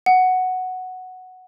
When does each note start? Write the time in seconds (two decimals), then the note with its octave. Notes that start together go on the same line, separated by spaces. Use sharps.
0.06 F#5